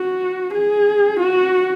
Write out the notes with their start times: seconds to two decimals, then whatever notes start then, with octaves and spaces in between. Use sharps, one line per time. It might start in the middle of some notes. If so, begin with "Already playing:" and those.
Already playing: F#4
0.54 G#4
1.20 F#4